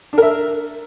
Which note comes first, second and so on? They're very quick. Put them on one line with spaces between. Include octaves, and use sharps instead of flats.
D4 A#4 E5